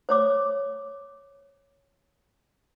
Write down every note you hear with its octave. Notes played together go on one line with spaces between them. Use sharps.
C5 C#5 D6